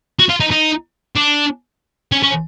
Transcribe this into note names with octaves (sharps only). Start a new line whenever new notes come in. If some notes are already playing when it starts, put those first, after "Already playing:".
F#4
F4
D#4
D#4
D4
C#4
C#4